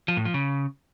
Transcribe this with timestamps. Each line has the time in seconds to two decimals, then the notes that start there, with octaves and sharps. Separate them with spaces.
0.08 F3
0.17 A2
0.25 F3
0.34 C#3